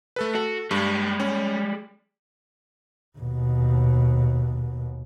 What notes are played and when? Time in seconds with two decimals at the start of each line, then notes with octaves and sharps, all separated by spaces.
0.16 A3 A4 B4
0.35 F#4 A4
0.71 G2 G3 G#3
1.20 C#4
3.19 D#2 B2